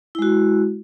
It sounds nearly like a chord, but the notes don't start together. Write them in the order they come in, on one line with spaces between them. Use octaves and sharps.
E4 G#3 F#4